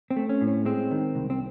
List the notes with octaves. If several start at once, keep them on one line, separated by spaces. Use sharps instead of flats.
C4
A3
C#4
A2
C#4
G#3 C4
D#3
C2
C4